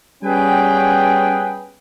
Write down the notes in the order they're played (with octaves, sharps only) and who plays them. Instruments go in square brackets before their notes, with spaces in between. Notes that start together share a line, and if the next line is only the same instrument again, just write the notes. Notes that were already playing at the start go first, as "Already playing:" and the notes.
[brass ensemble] G3 B3 C#4 G#4 B4 G5